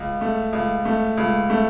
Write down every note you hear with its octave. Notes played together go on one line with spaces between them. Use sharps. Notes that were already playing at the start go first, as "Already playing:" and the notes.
Already playing: C#2
A3
C#2
A3
C#2
A3